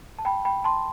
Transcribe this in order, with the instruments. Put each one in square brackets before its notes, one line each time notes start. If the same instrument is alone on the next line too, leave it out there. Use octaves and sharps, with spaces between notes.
[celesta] A5
G5 B5
G5 B5
A5 C6